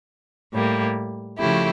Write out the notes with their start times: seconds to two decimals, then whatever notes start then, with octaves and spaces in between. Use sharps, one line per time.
0.53 A2 G3 A#3
1.39 C#3 F3 A3 E4 G4